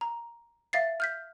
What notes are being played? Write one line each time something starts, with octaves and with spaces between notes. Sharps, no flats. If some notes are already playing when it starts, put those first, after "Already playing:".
A#5
E5 F5 A6 C7
F6 G6 B6